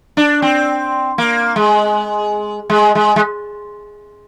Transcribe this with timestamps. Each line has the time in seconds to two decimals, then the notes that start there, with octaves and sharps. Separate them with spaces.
0.17 D4
0.42 C4
1.18 A#3
1.56 G#3
2.70 G#3
2.95 G#3
3.16 G#3